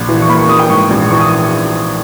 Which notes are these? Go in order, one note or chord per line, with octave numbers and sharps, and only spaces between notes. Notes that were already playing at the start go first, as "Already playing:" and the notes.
Already playing: A#1
E3
C#6
A#3 B5
C#6
A#3 D#6
G5
G#2 C#6
A#1
E3 C#6
D#6